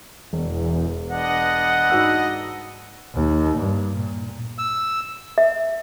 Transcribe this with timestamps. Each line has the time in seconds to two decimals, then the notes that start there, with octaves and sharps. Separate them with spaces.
0.33 E1 E2
1.11 D4 B4 D#5 F#5
1.90 G#2 F#4 E6
3.14 D#2
3.58 G2
3.93 A#2
4.58 E6
5.38 E5